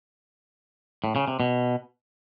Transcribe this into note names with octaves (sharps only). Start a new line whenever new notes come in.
A2
C#3
C3
B2